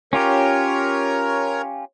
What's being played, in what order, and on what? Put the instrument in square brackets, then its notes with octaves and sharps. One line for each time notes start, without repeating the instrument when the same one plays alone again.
[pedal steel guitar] C#4 F4 G4 [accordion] A#4 C#5 A#5